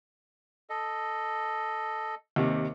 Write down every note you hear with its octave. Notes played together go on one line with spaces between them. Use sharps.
A4 D#5
D#2 C3